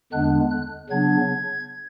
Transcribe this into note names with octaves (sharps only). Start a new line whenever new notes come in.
E2 D3 G#3 B3 D4 F#6
F#6
C#3 F#3 B3 D4 G#6